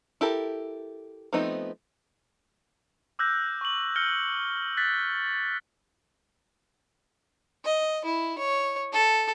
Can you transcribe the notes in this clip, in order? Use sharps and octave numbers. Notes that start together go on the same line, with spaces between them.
E4 G4 A4 A#4
F3 A3 B3 C4 D#4
D6 E6 F#6 G6 A#6
C#6 F#7
F6 G6 A#6 C#7 G7
F#6 A6 B6
D#5
E4
C#5
A4